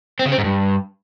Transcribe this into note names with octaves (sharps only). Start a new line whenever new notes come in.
C4
C#3
C4
G#2
G2